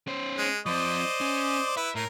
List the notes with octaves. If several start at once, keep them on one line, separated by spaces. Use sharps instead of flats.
C#4 C5
G#3
F3 C4 C5 D5 D#5
C#4
E4 B4 E5
A2 A#4